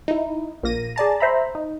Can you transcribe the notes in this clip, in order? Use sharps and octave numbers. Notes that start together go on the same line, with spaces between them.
D#4 E4
A#1 A#2 A#3 A#6 D#7
G#4 D5 A5 A#5
C5 E5 A#5 B5
D#4